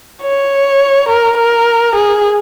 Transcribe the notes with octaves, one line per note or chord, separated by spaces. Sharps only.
C#5
A#4
A#4
G#4